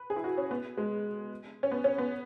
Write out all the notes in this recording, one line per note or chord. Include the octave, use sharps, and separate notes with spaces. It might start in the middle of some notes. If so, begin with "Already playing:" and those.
Already playing: B4
G#4
E4
F#4
C#4
B3
G#3
C#4
B3
C#4
B3